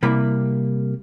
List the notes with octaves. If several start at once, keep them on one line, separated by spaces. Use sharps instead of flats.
C3 G3 A#3 E4 B5